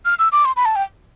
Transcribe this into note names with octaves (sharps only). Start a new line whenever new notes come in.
F6
E6
D6
C6
B5
A5
G5